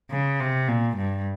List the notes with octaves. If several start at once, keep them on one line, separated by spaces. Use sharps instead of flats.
C#3
C3
A#2
G2